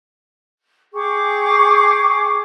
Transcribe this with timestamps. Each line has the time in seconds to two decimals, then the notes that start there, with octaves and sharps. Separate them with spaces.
0.94 G#4 G5 C#6 D6